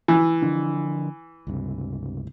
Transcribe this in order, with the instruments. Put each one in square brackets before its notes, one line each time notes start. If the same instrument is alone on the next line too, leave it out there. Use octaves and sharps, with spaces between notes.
[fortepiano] E3
[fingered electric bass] D3 F3 D4
C#2 G2 C3